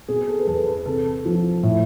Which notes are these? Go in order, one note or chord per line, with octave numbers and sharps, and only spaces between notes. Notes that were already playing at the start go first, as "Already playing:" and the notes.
B2 G#4
A4
B4
E2 A4
B4
C3 A4
F3
A2